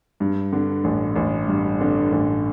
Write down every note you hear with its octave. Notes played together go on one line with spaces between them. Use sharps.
G2
D3
A1
A1
G2
D3
A1